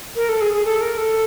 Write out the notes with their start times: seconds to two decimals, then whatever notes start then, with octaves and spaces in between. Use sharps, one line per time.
0.16 A#4
0.29 A4
0.41 G#4
0.53 G#4
0.66 A4
0.81 A#4
0.98 A4